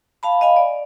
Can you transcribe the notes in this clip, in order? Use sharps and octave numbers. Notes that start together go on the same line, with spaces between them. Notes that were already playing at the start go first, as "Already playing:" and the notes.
F5 A5 B5
D#5 F5 G#5 B5
D5